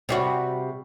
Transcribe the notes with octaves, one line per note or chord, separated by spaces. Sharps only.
C3 G3 F#4